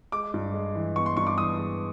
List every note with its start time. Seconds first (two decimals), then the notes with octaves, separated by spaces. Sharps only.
0.12 G#3 D6
0.34 G2
0.54 G#3
0.75 E3
0.96 B3 C#6
1.06 C6
1.17 G2 C#6
1.27 D6
1.37 E3 D#6
1.59 G#3